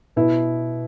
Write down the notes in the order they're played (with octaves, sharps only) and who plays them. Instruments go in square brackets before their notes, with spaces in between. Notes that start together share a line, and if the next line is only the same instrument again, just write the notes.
[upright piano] B2 E4